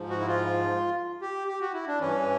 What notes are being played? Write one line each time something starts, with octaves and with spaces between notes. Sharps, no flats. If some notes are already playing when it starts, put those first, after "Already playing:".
Already playing: G#2 F3
F#4
E4
F4
G4
G4
F#4
E4
D4
G2 E3 C#4